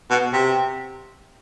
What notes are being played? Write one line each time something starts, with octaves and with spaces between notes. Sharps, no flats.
B2
C3